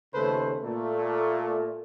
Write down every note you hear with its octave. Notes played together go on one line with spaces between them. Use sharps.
D#2 C#3 A3 A4 B4 C5
A#2 A3